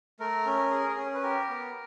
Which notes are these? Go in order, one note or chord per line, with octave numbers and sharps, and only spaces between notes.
A3 A#4
C#4
G#4
C#4
B4
G4 A#4
B3